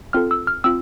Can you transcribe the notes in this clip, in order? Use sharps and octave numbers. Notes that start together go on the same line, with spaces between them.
C4 F4 A4 F6
E6
F6
C4 F4 E6